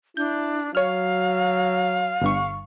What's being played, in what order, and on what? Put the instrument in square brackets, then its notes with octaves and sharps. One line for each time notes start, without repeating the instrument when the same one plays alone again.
[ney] D4 [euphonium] E4 [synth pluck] G6
[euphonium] F#3 [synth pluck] C#5 F6 [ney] F5
[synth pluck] G1 G2 C#6